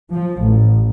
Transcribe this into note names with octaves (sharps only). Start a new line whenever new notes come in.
F3
A1